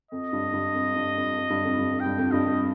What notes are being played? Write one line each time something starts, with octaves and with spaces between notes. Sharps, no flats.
F2 D#5
G2
G2
F2
G2
F2
F2
G2
F2
G2
F2
G5
G2
F2
G2 D#5
F2